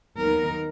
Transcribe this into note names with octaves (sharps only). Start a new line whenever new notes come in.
D#2 D#3 F#3 B3 D#4 A#4